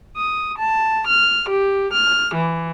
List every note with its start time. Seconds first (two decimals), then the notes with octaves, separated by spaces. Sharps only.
0.17 D#6
0.59 A5
1.07 F6
1.49 G4
1.93 F6
2.35 E3